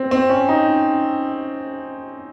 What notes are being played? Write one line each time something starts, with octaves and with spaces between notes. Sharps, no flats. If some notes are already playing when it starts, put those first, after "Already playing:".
Already playing: C4
C4
C#4
D#4